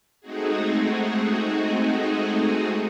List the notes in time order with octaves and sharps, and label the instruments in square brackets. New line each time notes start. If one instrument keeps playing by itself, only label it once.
[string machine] G#3 A3 C4 D#4 F#4 G#4